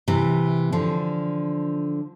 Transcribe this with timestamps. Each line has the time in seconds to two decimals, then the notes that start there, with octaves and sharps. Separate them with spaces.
0.08 C3 E3
0.72 D3 F3